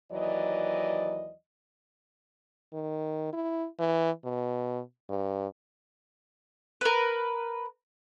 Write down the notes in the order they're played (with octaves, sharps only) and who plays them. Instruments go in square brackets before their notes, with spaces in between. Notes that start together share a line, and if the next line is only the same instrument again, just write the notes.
[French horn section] D#2 E3 F#3 D5 D#5
[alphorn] D#3
E4
E3
B2
G2
[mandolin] A#4 B4